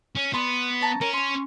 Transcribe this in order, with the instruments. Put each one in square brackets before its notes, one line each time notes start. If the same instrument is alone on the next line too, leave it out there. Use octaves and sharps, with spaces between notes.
[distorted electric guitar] C#4
[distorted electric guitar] B3 [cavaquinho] D5 B5 C6
[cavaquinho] C#5 A5 A#5
[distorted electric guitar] C#4 [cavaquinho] A#4
[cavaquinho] C6 C#6